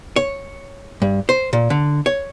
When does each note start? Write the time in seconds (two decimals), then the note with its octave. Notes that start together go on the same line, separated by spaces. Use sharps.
0.16 C#5
1.02 G2
1.29 C5
1.53 A#2
1.70 D3
2.06 C#5